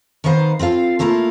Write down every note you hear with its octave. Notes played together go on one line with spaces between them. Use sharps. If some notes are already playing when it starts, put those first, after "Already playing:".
D#3 B3 D#4 C5 F5
C4 F4 A4 F5
A3 A#3 E4 F4 A4